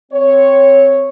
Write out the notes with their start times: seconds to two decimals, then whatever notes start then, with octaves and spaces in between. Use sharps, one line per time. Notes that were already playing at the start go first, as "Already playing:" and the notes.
0.12 C4 C#5